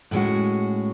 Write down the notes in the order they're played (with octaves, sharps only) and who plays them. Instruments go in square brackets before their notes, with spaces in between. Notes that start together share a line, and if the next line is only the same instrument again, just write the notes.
[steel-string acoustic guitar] A2 G#3 C#4 F#4